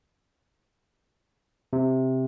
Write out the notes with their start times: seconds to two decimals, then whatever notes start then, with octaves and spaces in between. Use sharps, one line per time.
1.73 C3